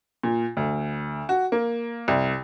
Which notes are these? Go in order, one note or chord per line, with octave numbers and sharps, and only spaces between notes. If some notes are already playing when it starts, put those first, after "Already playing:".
A#2
D2
F#4
A#3
C2